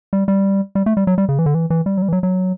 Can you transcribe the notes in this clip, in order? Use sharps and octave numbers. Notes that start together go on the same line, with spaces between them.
G3
G3
G3
A3
G3
F#3
G3
C#3
E3
D3
E3
E3
G3
F#3
G3
E3
F#3
F#3